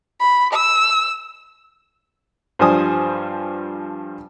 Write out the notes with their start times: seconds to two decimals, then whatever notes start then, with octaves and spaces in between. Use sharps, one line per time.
0.20 B5
0.54 E6
2.59 G2 F3 G3 C5 G#5 D#6